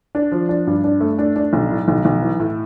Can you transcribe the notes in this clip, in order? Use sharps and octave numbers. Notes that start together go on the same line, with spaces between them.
D4
F3
D4
G2
D4
A3
D4
D4
B1
A2
B1
B1
E3
A2